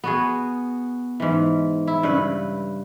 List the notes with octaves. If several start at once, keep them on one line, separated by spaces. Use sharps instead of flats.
B3 F#4 G#4
G#2 E3
E4
G2 C#3 B4